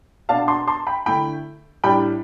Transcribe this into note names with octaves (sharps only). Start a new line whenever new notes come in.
B2 B3 D4 F5 A5
A5 C6
A5 C6
G5 B5
D3 A3 E4 G5 B5
A2 G3 D4 G5 B5